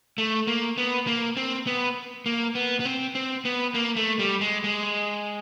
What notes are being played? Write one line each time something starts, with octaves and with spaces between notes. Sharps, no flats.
A3
A#3
B3
A#3
C4
B3
A#3
B3
B3
C4
C4
B3
A#3
A3
G3
G#3
G#3